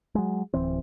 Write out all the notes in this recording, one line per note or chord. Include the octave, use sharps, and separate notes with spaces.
F#3 G#3
D1 E3 C4